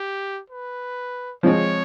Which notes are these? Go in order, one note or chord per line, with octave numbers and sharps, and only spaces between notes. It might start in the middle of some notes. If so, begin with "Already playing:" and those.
Already playing: G4
B4
F3 G#3 C4 C#5